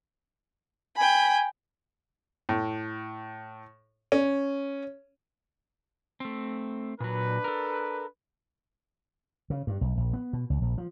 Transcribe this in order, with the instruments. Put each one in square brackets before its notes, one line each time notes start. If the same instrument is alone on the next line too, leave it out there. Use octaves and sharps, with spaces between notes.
[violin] G5 B5 [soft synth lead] G#5
[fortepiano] A2
C#4
[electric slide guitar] A3 C4
[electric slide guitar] A#2 F#3 [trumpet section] D4 B4
[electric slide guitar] A4 A#4
[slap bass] C#3
G2
B1
A#1
B3
B2
C#2
A#1
F3